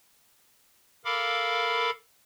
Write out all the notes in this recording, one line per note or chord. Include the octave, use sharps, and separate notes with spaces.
A4 A#4 F5 B5 D6